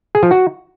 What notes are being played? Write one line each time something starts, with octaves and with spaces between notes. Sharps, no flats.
G#4
F3
F#4